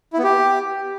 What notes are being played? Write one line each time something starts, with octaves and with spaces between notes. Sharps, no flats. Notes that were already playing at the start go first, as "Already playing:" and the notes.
E4
B3
G4